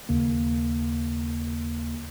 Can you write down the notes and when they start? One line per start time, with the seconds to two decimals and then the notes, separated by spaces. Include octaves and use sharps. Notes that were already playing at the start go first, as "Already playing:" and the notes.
0.09 D#2 C#3 A#3